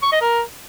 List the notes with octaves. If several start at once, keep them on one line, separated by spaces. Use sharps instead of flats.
C#6
D#5
A#4